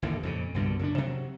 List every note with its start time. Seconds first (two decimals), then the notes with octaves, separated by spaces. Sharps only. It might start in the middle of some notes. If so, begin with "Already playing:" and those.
0.02 A1 D#2 A2 D3
0.23 F2 A#2 C#3
0.54 C2 G2 B2 D3
0.79 F#2 C#3 D4
0.98 C3 F#3